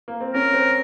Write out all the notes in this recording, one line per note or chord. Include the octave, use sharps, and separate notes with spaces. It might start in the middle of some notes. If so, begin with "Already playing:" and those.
A#3
C4
C#4 A#4
C4